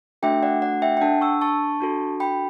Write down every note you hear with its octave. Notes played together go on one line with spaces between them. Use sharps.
A3 D4 F#4 A4 E5 G5
D5 F#5
D5 F#5
E5 G5
G5
D4 A4 F#5 A5
C#6 E6
A5 C#6
D4 F#4 A4
G5 B5